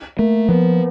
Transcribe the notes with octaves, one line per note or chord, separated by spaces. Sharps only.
A3 A#3
F3 B3